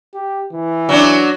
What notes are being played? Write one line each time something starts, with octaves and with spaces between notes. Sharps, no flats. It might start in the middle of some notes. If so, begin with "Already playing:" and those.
G4
E3
F#3 D4